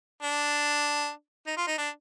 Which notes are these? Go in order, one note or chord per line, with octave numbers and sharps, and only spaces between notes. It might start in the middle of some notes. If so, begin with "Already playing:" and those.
D4
D#4
F4
D#4
D4